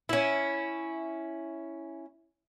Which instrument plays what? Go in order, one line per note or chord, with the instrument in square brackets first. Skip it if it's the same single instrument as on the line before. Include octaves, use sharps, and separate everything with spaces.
[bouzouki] C#4 E4